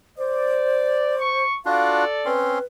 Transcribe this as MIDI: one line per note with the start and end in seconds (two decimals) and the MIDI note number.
0.18 1.44 72
0.18 1.13 74
1.19 1.52 85
1.66 2.04 62
1.66 2.04 65
1.66 2.04 66
1.66 2.31 69
1.66 2.31 74
1.66 2.03 77
2.26 2.59 60
2.26 2.59 61
2.26 2.64 71
2.26 2.59 84